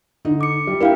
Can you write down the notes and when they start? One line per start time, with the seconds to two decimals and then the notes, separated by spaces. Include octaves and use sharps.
0.25 D3 D#4
0.41 D6 C#7
0.67 G3
0.81 D4 E4 G4 A#4 F5 G5